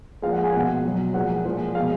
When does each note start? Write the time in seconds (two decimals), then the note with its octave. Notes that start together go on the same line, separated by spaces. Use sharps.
0.22 A#2 F3 G#3 F5
0.33 F#5
0.43 G#4 G#5
0.53 B2 G#3 F#5
0.84 B2 F#3
1.14 A#2 F3 G#3 F#5
1.45 A#2 F3 G#3
1.75 B2 G#3 F5